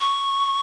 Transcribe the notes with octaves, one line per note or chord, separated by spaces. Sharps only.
C#6